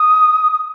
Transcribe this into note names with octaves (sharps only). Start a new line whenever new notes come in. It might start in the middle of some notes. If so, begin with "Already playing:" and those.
Already playing: D#6